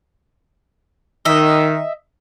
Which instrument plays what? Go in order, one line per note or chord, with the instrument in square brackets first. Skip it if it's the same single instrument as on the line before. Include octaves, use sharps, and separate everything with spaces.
[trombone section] D#3 [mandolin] D#5 E5